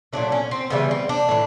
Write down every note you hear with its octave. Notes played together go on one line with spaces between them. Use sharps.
A#2 F#3 A3 D4
C#4
C4
C#3 E3 G3 B3
C4
D4
A2 E3